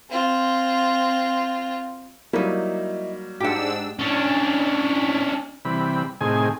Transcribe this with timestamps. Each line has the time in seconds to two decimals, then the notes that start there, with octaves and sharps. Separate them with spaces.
0.10 C4 F4
2.33 F#3 G3 A#3 D#4 E4
3.40 G#2 D4 G4 F#5 E6
3.99 C#4 D4
5.65 C3 E3 G3 B5
6.21 A2 C3 D#3 G#4 G#5